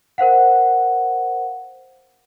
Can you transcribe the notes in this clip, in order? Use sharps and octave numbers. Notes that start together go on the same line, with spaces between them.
A#4 C5 F5 F#5